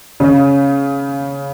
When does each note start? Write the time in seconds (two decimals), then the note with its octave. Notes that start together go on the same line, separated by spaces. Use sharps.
0.20 C#3